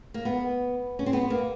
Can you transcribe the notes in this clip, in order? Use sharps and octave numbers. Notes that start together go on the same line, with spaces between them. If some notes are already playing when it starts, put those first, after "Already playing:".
A#3
B3
C#4
C4
B3
A#3